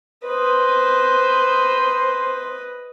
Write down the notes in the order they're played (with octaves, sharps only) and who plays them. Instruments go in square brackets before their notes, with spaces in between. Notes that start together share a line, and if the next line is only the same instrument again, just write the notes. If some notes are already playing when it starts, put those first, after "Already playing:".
[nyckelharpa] B4 D#5 [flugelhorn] C5